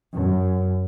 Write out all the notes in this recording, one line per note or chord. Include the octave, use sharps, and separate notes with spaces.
F#2